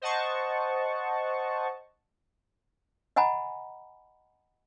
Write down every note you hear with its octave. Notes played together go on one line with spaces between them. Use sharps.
C5 D#5 F#5 A5 C#6
D#5 F#5 G#5 A#5 B5